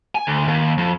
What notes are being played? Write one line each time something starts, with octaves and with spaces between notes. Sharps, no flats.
G#5
D2
D#2
F2